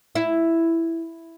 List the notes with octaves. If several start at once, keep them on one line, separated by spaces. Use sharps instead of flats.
E4